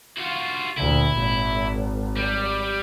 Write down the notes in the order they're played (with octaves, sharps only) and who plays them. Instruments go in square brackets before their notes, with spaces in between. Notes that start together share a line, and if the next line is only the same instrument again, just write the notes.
[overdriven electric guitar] F4 F#4
[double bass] D2 A#2 [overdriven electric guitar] E4
[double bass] G#1
[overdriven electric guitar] G3